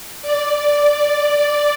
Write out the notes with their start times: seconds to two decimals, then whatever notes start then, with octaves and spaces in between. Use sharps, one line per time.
0.22 D5